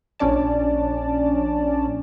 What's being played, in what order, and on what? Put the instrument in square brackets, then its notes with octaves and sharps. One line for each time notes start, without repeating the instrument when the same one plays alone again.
[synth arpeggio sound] A#1 C#4 D4 D5 A5